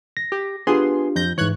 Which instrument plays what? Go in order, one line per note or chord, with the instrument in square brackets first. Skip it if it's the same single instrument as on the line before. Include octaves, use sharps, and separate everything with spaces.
[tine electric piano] A#6
[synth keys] G4
[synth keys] B3 G#4 C6 [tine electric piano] D4 F4 G4
[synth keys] F2 G6 A#6
[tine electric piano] G#2 E3 [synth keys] C#5 F#6 G#6